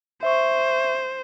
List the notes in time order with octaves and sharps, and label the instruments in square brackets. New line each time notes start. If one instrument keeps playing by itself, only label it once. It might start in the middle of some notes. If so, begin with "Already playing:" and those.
[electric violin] C5 [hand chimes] E5 C#6